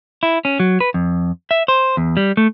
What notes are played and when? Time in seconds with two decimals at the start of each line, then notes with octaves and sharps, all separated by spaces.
0.23 E4
0.45 C#4
0.60 F#3
0.80 B4
0.94 F2
1.51 E5
1.68 C5
1.97 E2
2.17 G3
2.37 A3